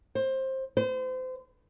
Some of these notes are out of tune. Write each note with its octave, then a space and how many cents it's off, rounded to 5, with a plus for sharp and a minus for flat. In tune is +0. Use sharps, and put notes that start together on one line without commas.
C5 +20
C5 -30